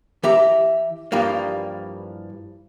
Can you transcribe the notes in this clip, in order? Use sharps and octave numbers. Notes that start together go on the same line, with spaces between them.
E3 G4 E5 A#5
G2 E3 F3 G3 A#3